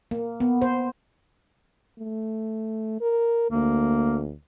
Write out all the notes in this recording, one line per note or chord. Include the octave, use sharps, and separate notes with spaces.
A#3
B3
C5
A3
A#4
D2 A#3